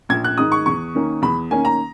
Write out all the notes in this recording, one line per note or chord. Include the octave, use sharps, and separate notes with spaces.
A#1 G#6
F#6
G#2 D#3 D#6
C#6
E2 C#6
D#3 A#3 C#4
E2 B5
D#3 A#3 C#4 G#5
A#5